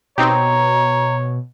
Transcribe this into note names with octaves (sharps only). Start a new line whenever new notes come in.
B2 C4 D#4 G4 C#5 A#5